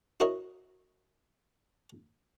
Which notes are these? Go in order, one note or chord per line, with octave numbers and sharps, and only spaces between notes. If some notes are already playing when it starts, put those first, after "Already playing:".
E4 F#4 A#4 C#5 D#5